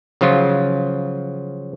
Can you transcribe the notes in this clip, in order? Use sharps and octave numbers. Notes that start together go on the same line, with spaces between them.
C#3 F3 F#3 F4